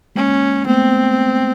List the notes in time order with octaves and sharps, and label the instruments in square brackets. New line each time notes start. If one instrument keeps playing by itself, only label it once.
[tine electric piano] G#3 A#3 [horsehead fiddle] C#4
[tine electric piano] A3 B3 [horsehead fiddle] C4